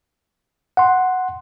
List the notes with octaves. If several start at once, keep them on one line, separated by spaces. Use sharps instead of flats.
F#5 C6